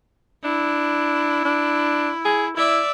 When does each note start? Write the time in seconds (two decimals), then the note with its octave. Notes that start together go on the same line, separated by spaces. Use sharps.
0.44 D4 E4
1.45 D4
2.25 G#4
2.57 E4 D5 E5